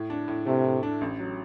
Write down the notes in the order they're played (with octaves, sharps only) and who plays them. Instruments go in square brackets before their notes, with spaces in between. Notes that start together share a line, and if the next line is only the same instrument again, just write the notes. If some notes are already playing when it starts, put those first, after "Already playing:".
Already playing: [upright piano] A2
D4
A2
[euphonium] C3 [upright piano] A3
[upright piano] A2
D4
A1
F#3